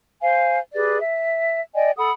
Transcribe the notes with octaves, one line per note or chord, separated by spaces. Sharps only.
C5 F5 G#5
G4 G#4 B4 D5
E5
D5 D#5 G5 G#5
A4 F#5 B5 D#6